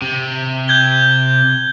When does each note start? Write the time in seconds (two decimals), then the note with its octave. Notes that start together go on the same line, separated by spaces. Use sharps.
0.02 C3
0.68 G6 G#6 G7